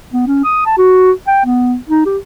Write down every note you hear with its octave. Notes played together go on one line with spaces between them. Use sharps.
B3
C#4
D#6
A5
F#4
G5
B3
D#4
G4